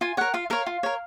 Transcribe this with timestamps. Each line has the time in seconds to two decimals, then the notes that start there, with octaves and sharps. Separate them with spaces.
0.01 F4 G#5
0.17 A#4 C#5 F#5
0.34 F4 F5
0.50 A#4 C#5 F5
0.66 F4
0.83 A#4 C#5